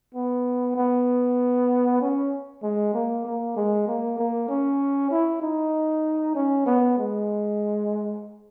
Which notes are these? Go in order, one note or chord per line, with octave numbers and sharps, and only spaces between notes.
B3
B3
C#4
G#3
A#3
A#3
G#3
A#3
A#3
C#4
E4
D#4
C#4
B3
G#3